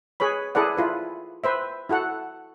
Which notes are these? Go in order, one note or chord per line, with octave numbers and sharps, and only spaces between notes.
G#4 B4 C#5 B5
E4 G#4 A4 B4 D5 F#5
E4 F4 B4
B4 C5 E5
E4 F#4 A4 F#5